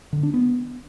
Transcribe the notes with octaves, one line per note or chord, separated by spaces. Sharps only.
D3
D4
B3